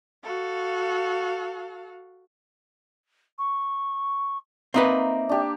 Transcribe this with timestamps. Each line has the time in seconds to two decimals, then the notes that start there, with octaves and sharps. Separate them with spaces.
0.23 F#4 A4 F5
3.39 C#6
4.74 A#3 C4 D#4 B4 E5
5.29 D4 G4